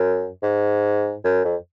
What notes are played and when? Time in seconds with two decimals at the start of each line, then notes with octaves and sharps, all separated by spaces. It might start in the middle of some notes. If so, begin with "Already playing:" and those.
Already playing: F#2
0.43 G#2
1.24 F#2
1.45 F2